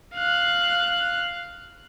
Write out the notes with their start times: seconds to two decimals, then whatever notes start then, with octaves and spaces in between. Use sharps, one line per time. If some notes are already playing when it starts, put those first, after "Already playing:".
0.15 F5 F#6